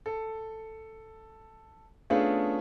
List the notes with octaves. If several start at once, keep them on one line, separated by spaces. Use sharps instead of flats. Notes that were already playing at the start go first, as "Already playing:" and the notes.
A4
A3 B3 C#4 D4 F4 G#4